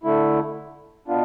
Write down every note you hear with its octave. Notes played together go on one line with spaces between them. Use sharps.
D3 A3 E4
B2 B3 D4 F4